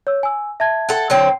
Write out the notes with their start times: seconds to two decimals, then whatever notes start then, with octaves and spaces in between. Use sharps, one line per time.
0.07 C#5 E6
0.23 G#5 E6
0.60 E5 A5 G#6
0.89 A4 F#5
1.10 D3 F#3 C4